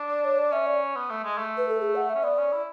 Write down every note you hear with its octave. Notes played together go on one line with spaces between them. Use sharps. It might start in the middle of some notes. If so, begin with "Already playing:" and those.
Already playing: D4
D5
C#5
D5
C#4 E5
D5
B3
A3
G#3
A3
B4
A4
G#4
F#5
E5
C#4
B3 D5
C#4
E4